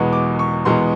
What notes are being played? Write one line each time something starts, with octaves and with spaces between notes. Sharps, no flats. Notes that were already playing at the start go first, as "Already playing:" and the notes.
Already playing: E2 B2 G#3 B3 C#6
D6
C#6
E2 B2 G#3 B3 C6